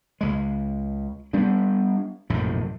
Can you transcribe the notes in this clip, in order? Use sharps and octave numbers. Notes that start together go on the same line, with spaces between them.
C#2 G#3
G3 B3 D4
A#1 F#2 A2 C3